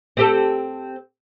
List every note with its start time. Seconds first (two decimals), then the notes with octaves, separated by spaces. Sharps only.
0.17 C4 G4 A4